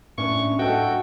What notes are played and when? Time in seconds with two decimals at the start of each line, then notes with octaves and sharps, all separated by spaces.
0.18 A2 C#4 D4 C#6
0.59 F#4 A4 D#5 G5